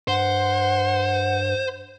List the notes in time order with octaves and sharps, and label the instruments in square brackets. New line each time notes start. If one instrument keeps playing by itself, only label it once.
[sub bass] G2 [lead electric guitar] C5 [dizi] F#5